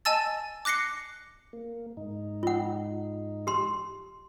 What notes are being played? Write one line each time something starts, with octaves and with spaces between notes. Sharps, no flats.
D#5 G#5 A5 E6 A6
D6 F#6 A#6 C7 C#7
A#3
G#2 D#4
F4 F#5
G4 C6